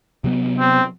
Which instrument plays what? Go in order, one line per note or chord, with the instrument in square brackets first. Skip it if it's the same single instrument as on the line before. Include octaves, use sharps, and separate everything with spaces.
[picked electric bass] C3 F#3 B3
[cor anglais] C4